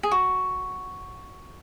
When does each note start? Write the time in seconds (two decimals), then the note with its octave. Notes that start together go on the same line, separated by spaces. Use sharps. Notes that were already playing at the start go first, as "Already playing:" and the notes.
0.03 G#4
0.11 F#4